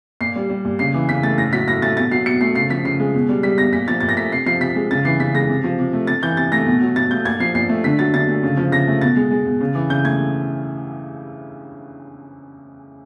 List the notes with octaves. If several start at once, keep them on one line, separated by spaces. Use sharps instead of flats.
A#2 C7
G3
G3
A#2
C#3 C7
E3
C#3 B6
A3 A6
A2 A#6
F#3 B6
A2 A#6
A3 A6
B2 A6
F#3 C7
B2 C#7
A3 C7
C#3 C7
F3 B6
C#3 C7
G#3
B2
G3
G3 B6
B2 A#6
A#2 B6
F3 A6
A#2 A6
A#6
A3 B6
C3 C7
F3 C7
C3 B6
G#3
C#3 A6
E3 C7
C#3 B6
G#3 A#6
C3
F3
C3
A3
C3 A6
E3 G6
C3 A6
A3 A#6
B2
F#3
B2 A6
A3 G6
A#2 G#6
F3 C7
A#2 C7
A3
D3 B6
F#3 A6
D3 A6
A3
C#3
F3
C#3 A#6
A3
B2 A6
G#3
G#3
B2
C#3
E3
C#3 G6
A3 G#6